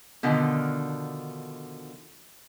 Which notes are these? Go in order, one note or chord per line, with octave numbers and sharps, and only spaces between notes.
B2 D3 D#3 F3